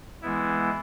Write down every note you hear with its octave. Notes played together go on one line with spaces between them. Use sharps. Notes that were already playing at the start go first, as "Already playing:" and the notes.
E3 G#3 B3 E4